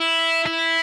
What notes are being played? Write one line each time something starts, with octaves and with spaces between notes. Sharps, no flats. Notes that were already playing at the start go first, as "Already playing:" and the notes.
Already playing: E4
E4